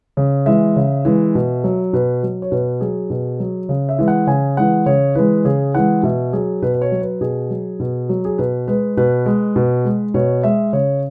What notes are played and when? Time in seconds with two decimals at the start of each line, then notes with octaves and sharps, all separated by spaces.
0.17 C#3
0.46 E3 G#3 E5
0.76 C#3
1.05 E3 G#3
1.35 B2
1.64 F#3
1.93 B2 B4
2.23 F#3
2.42 C#5
2.51 B2 B4
2.81 F#3 G#4
3.10 B2
3.40 F#3
3.69 C#3
3.89 E5
3.99 E3 G#3
4.08 F#5
4.27 C#3 G#5
4.57 E3 G#3 F#5
4.86 C#3 C#5
5.15 E3 G#3 B4
5.45 C#3 G#4
5.75 E3 G#3 F#5
6.03 B2 E5
6.33 F#3 G#4
6.62 B2 B4
6.75 B4
6.82 C#5
6.92 F#3
7.01 B4
7.21 B2 G#4
7.50 F#3
7.80 B2
8.09 F#3
8.25 G#4
8.38 B2 B4
8.68 G#3 B4
8.97 B2 B4
9.26 G#3
9.56 B2
9.85 G#3
10.14 B2 C#5
10.43 G#3 E5
10.73 C#3 C#5